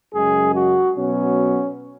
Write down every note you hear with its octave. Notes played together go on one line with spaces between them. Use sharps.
F#2 C#3 G#3 G#4
F#4
B2 F#3 B3 C#4